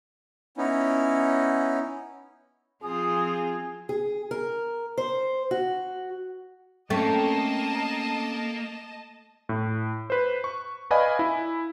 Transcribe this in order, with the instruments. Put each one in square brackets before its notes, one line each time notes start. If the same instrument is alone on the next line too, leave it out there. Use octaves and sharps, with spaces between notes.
[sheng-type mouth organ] B3 C#4 D#4 E4
[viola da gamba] F3 C4 F4 [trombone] G#4 [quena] D#6
[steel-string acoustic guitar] G#4
A#4
C5
F#4
[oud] A3 [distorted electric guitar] A#3 [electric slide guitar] C4 C#4 G5 [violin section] D#5 A5
[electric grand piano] A2
B4 C5
C#6
B4 D5 D#5 F5 G#5 B5
E4